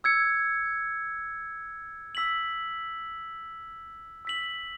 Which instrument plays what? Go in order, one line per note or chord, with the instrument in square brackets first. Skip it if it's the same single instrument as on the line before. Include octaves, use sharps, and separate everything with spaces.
[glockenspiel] E6 G#6 C#7
E6 B6 F#7
E6 B6 F#7